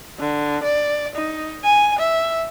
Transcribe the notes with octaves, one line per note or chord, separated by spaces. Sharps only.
D3
D5
D#4
G#5
E5